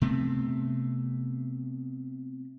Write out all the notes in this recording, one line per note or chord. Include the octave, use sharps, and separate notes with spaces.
C3 A3 B3 C4